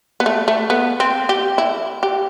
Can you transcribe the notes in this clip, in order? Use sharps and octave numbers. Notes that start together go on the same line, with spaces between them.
B3
A3
A3
B3
C4
G4
E4
G4